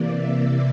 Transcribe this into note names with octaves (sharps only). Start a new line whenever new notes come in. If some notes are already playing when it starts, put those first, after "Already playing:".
Already playing: C3 E3 A#3 D5
E5